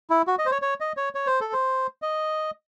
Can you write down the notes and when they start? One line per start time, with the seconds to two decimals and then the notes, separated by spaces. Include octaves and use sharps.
0.10 E4
0.27 F#4
0.39 D#5
0.46 C5
0.51 C#5
0.62 C#5
0.80 D#5
0.97 C#5
1.15 C#5
1.27 C5
1.41 A4
1.53 C5
2.02 D#5